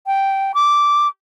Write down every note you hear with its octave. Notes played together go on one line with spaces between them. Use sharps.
G5
D6